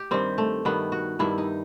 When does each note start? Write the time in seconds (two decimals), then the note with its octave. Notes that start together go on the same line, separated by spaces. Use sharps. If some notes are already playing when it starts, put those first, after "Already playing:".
Already playing: G4
0.11 G2 D#3 G3 C4
0.38 A3
0.65 G2 D#3 G3 B3
0.92 F#4
1.19 G2 D#3 G3 E4
1.38 D#4